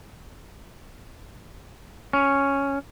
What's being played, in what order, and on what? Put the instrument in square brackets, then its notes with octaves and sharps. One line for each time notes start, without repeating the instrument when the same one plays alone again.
[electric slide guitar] C#4